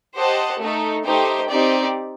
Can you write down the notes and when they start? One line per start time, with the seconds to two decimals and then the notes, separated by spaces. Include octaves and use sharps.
0.16 G4 C5 D#5 F#5 A5
0.60 A3 D#4 A4
1.04 A3 D#4 G4 C5 G5
1.49 C4 D#4 G4 D5